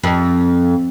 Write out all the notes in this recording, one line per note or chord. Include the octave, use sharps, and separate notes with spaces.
F2